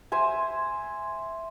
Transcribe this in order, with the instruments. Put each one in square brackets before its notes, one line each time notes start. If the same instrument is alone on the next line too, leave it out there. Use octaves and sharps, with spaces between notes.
[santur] C5 E5 G#5